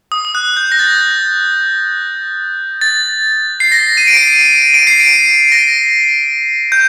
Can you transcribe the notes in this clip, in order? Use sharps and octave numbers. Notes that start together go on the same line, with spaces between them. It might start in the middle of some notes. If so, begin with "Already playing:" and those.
D#6
D#6
F#6
G6
A#6
A6
A6
C7
A#6
D#7
D7
C7
D#7
D7
C7
D7
A#6
G6